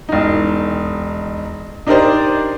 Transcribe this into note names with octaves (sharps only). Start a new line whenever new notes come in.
E1 D#4
D4 D#4 G4 A#4 C5 D5